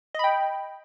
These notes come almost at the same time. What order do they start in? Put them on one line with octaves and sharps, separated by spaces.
D#5 B5 G5